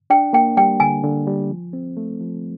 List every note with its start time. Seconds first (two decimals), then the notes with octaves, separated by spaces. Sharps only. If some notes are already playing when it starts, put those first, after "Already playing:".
0.10 D4 G5
0.33 A#3 G5
0.57 G3 G5
0.80 D3 G#5
1.04 D3
1.27 G3
1.50 F3
1.73 C4
1.97 A3
2.21 F3